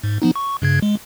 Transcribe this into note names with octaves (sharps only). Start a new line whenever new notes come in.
G#2
F3 B3 D#4
C#6
G2 C#3 G#6
G#3